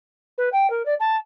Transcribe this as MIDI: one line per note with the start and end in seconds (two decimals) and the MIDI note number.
0.38 0.49 71
0.53 0.70 79
0.70 0.85 70
0.86 0.95 74
1.00 1.16 81